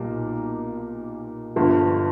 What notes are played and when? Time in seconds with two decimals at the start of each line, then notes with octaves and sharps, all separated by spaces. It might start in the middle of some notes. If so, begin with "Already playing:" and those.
Already playing: B1 A#2 G3 A#3
1.56 G1 G2 D3 F3